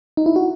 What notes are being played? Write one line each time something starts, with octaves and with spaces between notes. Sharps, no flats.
D#4
E4
F#4